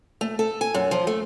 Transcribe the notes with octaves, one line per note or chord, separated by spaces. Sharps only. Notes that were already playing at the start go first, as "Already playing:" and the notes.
A3
A4
G#5
F#2
F3
A3